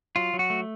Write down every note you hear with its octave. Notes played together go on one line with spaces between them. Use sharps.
F#3 F4
F#3
F#4
A3